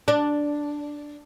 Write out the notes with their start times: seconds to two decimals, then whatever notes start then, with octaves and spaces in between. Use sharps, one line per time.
0.08 D4